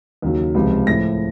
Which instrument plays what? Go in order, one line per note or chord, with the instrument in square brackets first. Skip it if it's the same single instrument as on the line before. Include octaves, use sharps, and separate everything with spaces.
[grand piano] D#2 C#3 F#3
C#2 C3 F3
A2 F3 A#6